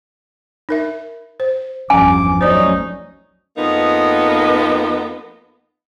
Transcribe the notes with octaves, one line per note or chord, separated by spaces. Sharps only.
D#4 A#4 E5
C5
G1 E2 F3 C#4 G#5 D6
F#3 A3 C#4 D#4 C5 D5
F2 A#3 B3 D#4